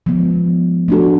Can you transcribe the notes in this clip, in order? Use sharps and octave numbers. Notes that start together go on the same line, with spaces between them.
F3 G#3 B3
A3 D4 F#4 A4